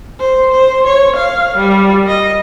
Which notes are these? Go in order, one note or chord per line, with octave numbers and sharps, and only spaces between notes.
C5
C5
C#5
F5
G3
D#5